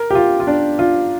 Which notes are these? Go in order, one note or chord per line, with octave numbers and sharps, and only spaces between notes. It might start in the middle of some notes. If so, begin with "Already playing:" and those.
Already playing: A#4
G4
F4
F4
D4
F4